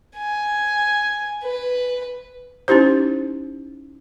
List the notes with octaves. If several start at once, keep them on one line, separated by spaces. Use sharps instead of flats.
G#5
B4
C#4 D#4 E4 G4 C5